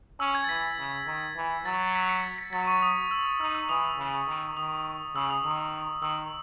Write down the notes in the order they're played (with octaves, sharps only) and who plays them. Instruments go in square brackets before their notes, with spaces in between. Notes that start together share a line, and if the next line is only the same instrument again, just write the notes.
[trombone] C#4 [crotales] E6
[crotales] G#6
A6
[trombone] E3 [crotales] B6
[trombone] C#3
D#3
E3
[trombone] F#3 [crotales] A6
[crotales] B6
C#7
A6
B6
[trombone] F#3 [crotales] A6
[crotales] C#6
D#6
E6
[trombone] D#4 [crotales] E6
[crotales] E6
[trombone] E3 [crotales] D#6
[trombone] C#3
D#3
[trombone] D#3 [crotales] D#6
[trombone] C#3 [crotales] E6
[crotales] D#6
[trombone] D#3 [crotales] D#6
[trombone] D#3 [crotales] E6